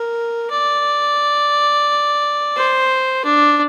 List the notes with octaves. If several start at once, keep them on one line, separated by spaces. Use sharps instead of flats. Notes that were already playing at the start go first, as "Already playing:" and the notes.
Already playing: A#4
D5
C5
D4